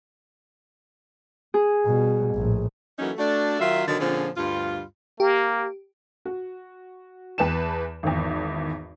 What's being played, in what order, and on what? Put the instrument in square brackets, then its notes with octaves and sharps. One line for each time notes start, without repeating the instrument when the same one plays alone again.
[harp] G#4
[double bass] B2 G3
A#1 A2
[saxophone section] E3 F#3 A3 A#3 C#4 D#4
A3 D4 F#4
D#3 F#3 F4 E5
B2 D3 D#3 F#3
A#2 D3 F3 C4 C#4 G#4
D2 G2 G3 F4
[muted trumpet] A#3 [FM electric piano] G4
[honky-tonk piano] F#4
E2 B4 A5 E7
G#1 E2